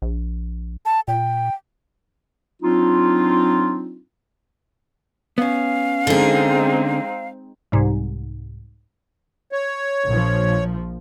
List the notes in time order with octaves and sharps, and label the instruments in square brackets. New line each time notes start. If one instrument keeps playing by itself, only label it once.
[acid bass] A#1
[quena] A5
[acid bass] A#2 [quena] G5
[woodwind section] F#3 C4 D4 D#4 F4
[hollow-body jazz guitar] B3 C#4 [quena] F5
[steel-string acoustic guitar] D3 G#4 [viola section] G#3 C4 D#4
[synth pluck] C2 G#2 C3
[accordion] C#5
[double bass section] A#1 F3